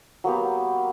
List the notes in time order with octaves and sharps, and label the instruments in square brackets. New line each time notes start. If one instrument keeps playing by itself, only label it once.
[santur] F#3 A#3 B3 G4